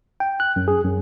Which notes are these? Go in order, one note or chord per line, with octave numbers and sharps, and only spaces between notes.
G5
F#6
F#2
G#4
F#2